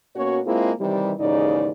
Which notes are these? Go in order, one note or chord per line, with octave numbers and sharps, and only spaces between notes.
B2 A#3 C#4 F#4 C#5
G#3 A#3 C4 E4 F4 G#4
C3 D#3 E3 G3
D#2 G#2 C#3 E3 D#4 D5